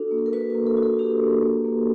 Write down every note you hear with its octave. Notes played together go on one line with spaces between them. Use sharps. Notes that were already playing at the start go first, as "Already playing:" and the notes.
Already playing: D4 F#4 A4
A#3
A4
A#4
F#4 B4
A#3 B4
A4
F#4
A4
D4 G4
A#3
A#3
A#3